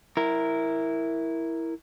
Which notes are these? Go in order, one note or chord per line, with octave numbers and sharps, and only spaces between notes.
E4 A#4